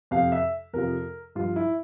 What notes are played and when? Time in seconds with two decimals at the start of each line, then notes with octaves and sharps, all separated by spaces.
0.11 F2 C3 F3 F5
0.32 E5
0.73 F2 C3 F3 A#4
1.35 G2 F3 F4
1.56 E4